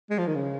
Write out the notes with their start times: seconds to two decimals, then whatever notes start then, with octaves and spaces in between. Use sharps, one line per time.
0.10 G#3
0.19 F3
0.27 D#3
0.35 C#3